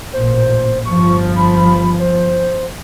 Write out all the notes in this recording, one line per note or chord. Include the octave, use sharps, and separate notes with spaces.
A1 A#2 C5
G1 F3 C#6
B5
C5